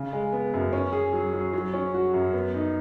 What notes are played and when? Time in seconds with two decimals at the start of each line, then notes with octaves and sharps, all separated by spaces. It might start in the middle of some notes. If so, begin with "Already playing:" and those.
Already playing: C#3
0.13 G#3
0.32 B3
0.53 F#2
0.73 C#4
0.93 G#4
1.13 F#3
1.33 F#3
1.53 F#3
1.74 C#4
1.94 F#4
2.14 F#2
2.33 B3
2.54 D#4